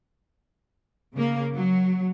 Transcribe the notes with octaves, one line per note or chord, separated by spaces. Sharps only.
C#3 A#3
F#3